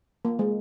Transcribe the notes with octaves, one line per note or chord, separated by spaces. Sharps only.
A#3
G#3